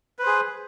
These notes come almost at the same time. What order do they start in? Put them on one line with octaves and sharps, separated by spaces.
B4 C5 G#4